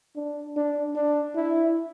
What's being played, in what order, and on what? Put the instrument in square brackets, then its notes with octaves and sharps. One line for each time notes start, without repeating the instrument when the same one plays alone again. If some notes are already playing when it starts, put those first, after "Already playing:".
[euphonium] D4
D4
D4
E4